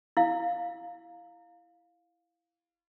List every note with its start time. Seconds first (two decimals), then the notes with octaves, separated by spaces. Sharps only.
0.17 E4 F5